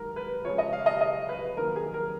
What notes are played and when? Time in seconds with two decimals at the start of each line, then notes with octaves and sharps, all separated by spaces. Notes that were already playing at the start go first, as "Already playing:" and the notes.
Already playing: G#2 D#3 F#3 A#4
0.16 B4
0.44 C#2 C#3 F3 C#5
0.58 D#5
0.73 F5
0.86 D#5
1.01 D#5
1.29 B4
1.57 D#2 D#3 F#3 A#4
1.76 G#4
1.94 A#4